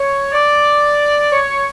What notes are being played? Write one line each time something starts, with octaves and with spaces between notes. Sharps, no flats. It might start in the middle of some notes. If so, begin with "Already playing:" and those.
Already playing: C#5
D5
C#5